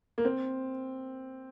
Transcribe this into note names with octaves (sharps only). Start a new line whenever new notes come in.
A#3
C4